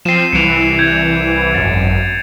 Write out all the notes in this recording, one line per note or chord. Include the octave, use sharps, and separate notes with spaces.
F3 C4 C7 D#7 E7
C2 E3 C#7 D7 F7
G6 G#6 C7
G#1 F#2 A6